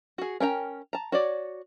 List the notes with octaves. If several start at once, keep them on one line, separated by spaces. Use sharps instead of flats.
F#4 G#4
C#4 A#4 G5 A#5
A5 A#5
F#4 C#5 D5